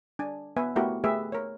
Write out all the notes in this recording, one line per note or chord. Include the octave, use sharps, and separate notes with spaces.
D4 G#5
B3 B4 E5 G#5
A3 B3 E4 F#4 G4 A#4
A3 G4 G#4 B4 E5
A#4 C#5